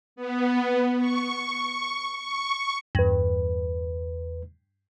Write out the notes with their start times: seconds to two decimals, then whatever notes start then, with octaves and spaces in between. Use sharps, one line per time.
0.16 B3
0.98 C#6
2.18 C#6
2.95 E2 G2 B4